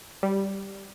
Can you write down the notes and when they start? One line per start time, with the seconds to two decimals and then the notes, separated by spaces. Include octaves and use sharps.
0.23 G3